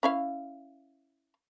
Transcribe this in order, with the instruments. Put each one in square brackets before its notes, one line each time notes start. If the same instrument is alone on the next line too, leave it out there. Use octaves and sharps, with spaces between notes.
[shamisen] C#4 E4 F5